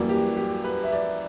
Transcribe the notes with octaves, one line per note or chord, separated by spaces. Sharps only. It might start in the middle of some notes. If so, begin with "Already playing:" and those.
Already playing: F#2 E3 G3 A#3 F#4
G4
G4
B4
E5
D5